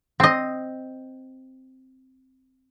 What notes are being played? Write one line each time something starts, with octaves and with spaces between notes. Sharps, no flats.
C4 D#5